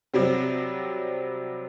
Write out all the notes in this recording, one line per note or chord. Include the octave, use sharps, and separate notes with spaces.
C3 F#3 G3 C4